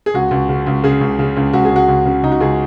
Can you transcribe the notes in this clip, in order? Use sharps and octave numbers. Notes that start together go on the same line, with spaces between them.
G#4
C#2 F#4
C#2
C#3
C#2
C#3 G#4
C#2
C#3
C#2
C#2 F#4
G#4
C#2 F#4
C#2
C#3
C#2 D#4
F#4
C#2 G#4